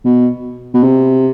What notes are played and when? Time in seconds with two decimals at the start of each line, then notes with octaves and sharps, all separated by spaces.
0.05 B2
0.74 B2
0.83 C3